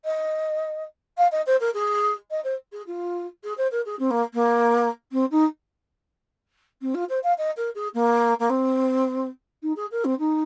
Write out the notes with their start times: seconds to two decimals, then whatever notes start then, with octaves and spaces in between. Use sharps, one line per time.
0.05 D#5
1.17 F5
1.32 D#5
1.46 C5
1.60 A#4
1.74 G#4
2.30 D#5
2.44 C5
2.72 G#4
2.87 F4
3.43 G#4
3.57 C5
3.71 A#4
3.85 G#4
3.99 C4
4.10 A#3
4.34 A#3
5.12 C4
5.31 D#4
6.81 C4
6.94 F4
7.09 C5
7.23 F5
7.38 D#5
7.56 A#4
7.75 G#4
7.94 A#3
8.39 A#3
8.49 C4
9.62 D#4
9.76 G#4
9.91 A#4
10.04 C4
10.19 D#4